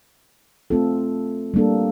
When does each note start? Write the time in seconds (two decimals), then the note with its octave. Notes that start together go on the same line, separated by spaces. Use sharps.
0.70 A3 C4 F4 A4
1.54 G3 A#3 D4 A4